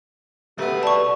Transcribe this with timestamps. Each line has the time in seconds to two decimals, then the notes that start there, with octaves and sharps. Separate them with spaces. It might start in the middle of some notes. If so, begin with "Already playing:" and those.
0.58 B1 A3 B3 G4 B4
0.83 D5 A5 C#6